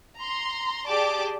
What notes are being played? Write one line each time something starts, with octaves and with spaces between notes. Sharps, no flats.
A#5 C6
G4 G#4 D5 A5 D6